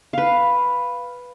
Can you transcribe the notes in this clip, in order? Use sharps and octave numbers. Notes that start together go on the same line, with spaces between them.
B4 F5